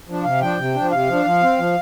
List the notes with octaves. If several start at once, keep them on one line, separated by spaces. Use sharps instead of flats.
F3 D4
C3 F5
F3 D4 G5
C3
F3 D4
C3 F5
F3 D4
F3
C4
F3